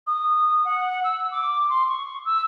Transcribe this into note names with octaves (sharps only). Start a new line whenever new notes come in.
D#6
F#5
E6
D6
C6
C#6
E6